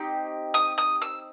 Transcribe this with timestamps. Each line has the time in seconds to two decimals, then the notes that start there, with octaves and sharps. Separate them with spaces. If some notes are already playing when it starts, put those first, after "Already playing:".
Already playing: C4 D#4 G4 D#6
0.54 D#6
0.78 D#6
1.02 E6